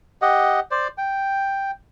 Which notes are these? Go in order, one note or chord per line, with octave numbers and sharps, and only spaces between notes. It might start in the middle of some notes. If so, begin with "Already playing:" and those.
G4 D#5 F#5
C5 D5
G5